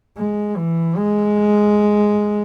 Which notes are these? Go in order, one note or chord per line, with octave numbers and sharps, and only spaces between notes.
G#3
E3
G#3